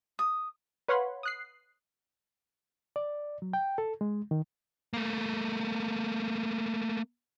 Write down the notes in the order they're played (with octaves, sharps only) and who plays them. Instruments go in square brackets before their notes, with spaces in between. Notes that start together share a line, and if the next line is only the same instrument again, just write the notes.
[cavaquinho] D#6
[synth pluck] B4 C#5 F5 F#5 B5 C6
D#6 F#6 C7
[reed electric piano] D5
F#3
G5
A4
G#3
D#3
[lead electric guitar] A3 A#3